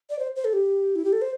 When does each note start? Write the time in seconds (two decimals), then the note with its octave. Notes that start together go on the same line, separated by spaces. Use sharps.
0.10 D5
0.19 C5
0.36 C5
0.45 A4
0.53 G4
0.96 E4
1.05 G4
1.13 A4
1.22 C5